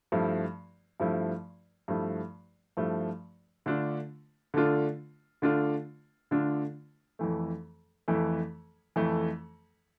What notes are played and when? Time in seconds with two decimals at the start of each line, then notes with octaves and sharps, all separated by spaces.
0.12 G2 F3 A3 E4
1.00 G2 F3 A3 E4
1.88 G2 F3 A3 E4
2.77 G2 F3 A3 E4
3.66 D3 A3 D4 F4
4.54 D3 A3 D4 F4
5.42 D3 A3 D4 F4
6.31 D3 A3 D4 F4
7.19 F2 E3 A3
8.08 F2 E3 A3
8.96 F2 E3 A3